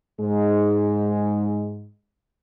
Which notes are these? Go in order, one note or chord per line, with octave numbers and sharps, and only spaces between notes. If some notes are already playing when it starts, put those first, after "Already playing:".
G#2 G#3